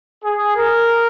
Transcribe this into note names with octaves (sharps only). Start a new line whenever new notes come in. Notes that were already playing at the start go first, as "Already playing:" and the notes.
G#4
A#4